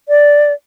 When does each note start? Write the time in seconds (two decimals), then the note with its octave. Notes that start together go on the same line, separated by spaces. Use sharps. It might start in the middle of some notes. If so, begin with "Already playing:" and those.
0.09 D5